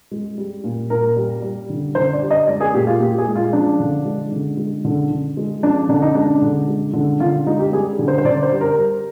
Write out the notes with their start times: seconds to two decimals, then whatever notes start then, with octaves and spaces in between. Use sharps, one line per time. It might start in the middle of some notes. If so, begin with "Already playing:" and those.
0.11 G#3
0.38 G3
0.64 A#2
0.90 A#2 A#4
1.17 G3
1.42 G3
1.70 D3
1.95 D3 C5
2.13 D5
2.22 G3
2.31 D#5
2.47 G#3 D5
2.61 G#4
2.74 A#2 G4
2.87 F4
3.00 A#2 G4
3.18 G#4
3.27 G#3
3.35 F4
3.53 F3 D4
3.80 D3
4.05 G#3
4.32 D3
4.57 G#3
4.85 D3
5.11 D3
5.37 G#3
5.62 F3 D4
5.89 D3 D4
6.02 D#4
6.15 G#3 D4
6.42 D3
6.68 G#3
6.93 D3
7.20 D3 F4
7.46 G#3 D#4
7.60 G4
7.72 G3 G#4
7.99 D3
8.08 C5
8.18 C5
8.25 D3 D5
8.43 C5
8.52 G3
8.61 A#4
8.78 G3